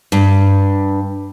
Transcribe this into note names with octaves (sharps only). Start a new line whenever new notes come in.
G2